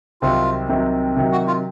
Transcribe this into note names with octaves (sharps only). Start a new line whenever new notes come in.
C2 C3 D#3 F#3 C4 F4
C2 C3 D#3 F#3 C4
C3 D#3 F#3
F#4
F4